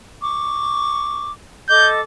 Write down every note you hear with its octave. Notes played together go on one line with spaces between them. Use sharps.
C#6 D6
A4 D#5 D6 G6